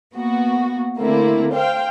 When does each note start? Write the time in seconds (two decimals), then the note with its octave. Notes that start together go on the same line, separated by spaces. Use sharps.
0.14 A#3 B3 F#4
0.97 D3 A3 A#3 C4 E4
1.54 C5 F5 G5